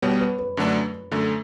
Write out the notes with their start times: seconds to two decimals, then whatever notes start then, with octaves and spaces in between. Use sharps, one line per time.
0.02 B2 G3 B3 C#5
0.20 B4
0.39 B4
0.57 F#2 D3 F#3 A3 D4
1.11 F#2 D3 A3